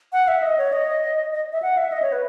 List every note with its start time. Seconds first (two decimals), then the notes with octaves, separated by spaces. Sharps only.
0.13 F#5
0.28 E5
0.42 D#5
0.58 C#5
0.72 D#5
1.32 D#5
1.52 E5
1.62 F#5
1.77 E5
1.92 D#5
2.02 C#5
2.12 B4